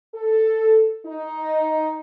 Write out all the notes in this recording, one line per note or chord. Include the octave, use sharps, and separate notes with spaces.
A4
D#4